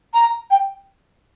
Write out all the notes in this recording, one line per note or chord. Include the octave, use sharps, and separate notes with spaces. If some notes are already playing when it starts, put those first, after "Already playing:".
A#5
G5